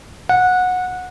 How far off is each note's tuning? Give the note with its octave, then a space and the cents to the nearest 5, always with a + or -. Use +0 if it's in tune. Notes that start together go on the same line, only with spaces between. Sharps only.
F#5 -20